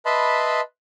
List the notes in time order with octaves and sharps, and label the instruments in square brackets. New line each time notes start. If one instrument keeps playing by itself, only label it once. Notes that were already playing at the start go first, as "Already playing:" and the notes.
[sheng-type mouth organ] B4 D#5 E5 A5 B5 C6